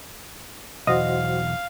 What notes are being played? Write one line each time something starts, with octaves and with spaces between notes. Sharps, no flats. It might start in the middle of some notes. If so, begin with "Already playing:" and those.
B1 E2 F#4 C5 D#5 F5